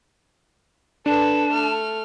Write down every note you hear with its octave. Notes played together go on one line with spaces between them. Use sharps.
D4 A4 B4 A5
A3 F6